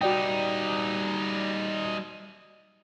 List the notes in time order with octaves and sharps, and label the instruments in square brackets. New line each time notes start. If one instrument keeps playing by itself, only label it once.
[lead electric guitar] G3 D#4 [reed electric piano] F#4 D5 G5